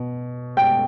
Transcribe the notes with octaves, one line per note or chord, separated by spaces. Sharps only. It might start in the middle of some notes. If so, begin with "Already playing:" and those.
Already playing: B2
G5